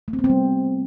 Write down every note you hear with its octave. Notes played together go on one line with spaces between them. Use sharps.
A3
C4
B3
C4
G3